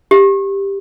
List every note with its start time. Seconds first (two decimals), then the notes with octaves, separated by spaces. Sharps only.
0.11 G4